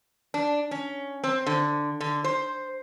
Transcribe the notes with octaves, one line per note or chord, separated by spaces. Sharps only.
D4
C#4
C4
D3
D3
C5